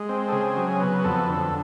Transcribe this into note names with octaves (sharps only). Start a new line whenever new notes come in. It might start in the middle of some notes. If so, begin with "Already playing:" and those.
Already playing: G#3
C4
A4
C#3 G#4
F#3
B3
F2 A4
D3